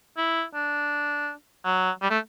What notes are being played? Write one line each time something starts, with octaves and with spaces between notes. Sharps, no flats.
E4
D4
F#3
G3
A3